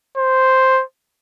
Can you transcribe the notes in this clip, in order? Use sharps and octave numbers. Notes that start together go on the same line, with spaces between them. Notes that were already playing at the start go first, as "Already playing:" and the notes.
C5